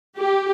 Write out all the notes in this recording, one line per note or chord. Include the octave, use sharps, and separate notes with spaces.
G4